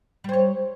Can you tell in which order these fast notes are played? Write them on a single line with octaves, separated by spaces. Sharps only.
G3 C5 C#5